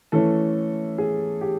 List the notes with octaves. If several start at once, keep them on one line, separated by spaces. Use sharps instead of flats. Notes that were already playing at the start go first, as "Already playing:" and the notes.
E3 A3 C#4 A4
G#4
G4